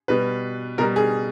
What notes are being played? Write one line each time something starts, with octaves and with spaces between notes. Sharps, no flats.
B2 G3 B4
B2 G3 A#4
G#4